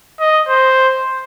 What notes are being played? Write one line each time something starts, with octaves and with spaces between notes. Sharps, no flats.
D#5
C5